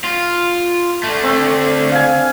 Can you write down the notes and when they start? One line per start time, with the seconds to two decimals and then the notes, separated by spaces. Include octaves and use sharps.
0.04 F4
1.03 D3 A3
1.23 C4
1.92 F5 G#5